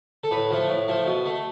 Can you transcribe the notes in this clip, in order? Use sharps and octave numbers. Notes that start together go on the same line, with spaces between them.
A4
A2 B4
F3 A3
A2
F3 A3
B2
A3